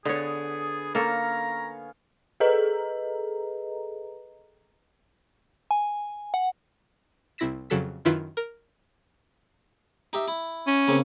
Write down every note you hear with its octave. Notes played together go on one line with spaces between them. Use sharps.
D3 B3 G#4 C#5
A#3 C#4 A4 F5 A#5 C#6
G#4 A4 B4 D#5 A#5
G#5
F#5
C2 C3 E4 A#6 B6 E7
F2 C#3 F#3 A4 E6 B6
F#2 D#3 E4 F4 B4
A#4
D#4 G4 E5
E4
C#4
C#3 A#3 C4